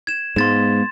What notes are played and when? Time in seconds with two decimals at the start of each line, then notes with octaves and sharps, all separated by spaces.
0.07 G#6 E7
0.36 G#2 G#3 B3 F5 C6 A6 E7